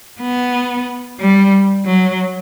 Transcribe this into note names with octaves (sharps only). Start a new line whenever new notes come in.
B3
G3
F#3